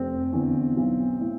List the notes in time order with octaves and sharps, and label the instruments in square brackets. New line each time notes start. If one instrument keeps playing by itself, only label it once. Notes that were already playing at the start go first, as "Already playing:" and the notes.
Already playing: [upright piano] F1 C4
E2 D3
B1
A2